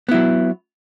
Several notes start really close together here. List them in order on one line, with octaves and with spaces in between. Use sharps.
B3 E4 F#3